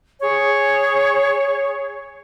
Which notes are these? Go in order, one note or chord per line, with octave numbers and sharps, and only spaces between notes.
G#4 C#5